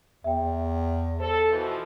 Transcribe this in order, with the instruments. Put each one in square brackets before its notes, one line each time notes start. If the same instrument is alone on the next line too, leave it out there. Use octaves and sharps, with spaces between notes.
[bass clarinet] E2 [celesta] E5 G5
[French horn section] A4 [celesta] C5
[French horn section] B2 E3 F3